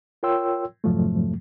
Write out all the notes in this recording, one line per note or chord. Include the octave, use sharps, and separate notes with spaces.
F4 A#4 C#5 G5 C6 E6
F2 G#2 C3 F3 F#3 A3